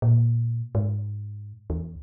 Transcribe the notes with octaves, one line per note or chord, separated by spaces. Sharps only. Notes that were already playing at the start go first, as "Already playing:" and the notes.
A#2
G#2
E2